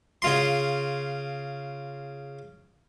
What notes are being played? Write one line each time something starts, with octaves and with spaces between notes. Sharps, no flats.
C#3 F4 C6